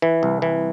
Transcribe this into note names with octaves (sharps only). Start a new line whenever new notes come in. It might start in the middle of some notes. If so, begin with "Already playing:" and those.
E3
C2
E3